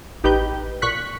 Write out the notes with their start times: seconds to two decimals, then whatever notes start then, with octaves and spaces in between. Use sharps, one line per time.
0.24 A1 D#4 G4 B4 G6
0.82 A#2 C#6 F#6 B6